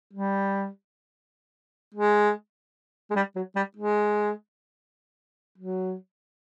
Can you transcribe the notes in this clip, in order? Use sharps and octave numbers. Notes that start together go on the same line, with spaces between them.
G3
G#3
G#3
G3
F#3
G3
G#3
F#3